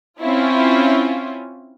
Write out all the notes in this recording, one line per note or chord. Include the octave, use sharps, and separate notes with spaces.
C4 C#4 E4 F4